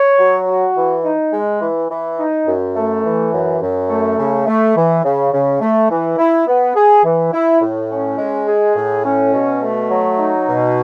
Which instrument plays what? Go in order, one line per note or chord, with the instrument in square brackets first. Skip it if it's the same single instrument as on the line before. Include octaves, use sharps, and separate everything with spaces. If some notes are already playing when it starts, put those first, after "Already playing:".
Already playing: [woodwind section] C#5
F#3
F#4
E3
D#4
G#3
E3
E3
D#4
F#2
A3
E3
F#2
F#2
A3
C#3
A3
E3
C#3
C#3
A3
E3
E4
B3
G#4
E3
E4
A2
C#4
G#3
G#4
A2
C#4
B2
A3
F#3
D#4
B2